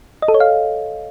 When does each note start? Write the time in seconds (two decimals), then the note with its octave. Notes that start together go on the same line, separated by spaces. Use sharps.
0.22 D#5
0.28 A4
0.34 C#5
0.40 F5